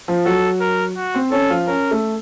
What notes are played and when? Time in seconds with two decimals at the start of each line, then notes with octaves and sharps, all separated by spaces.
0.08 F3 F4
0.25 F#3 F#4 A4
0.61 A#4
0.97 F#4
1.14 C4 C5
1.32 C#4 A4 C#5
1.50 F3 F4
1.67 C#4 A#4
1.91 A3 A4